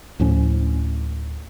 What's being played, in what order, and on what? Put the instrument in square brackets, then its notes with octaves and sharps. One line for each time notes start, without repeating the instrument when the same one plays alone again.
[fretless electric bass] D2 A2 F3 C#4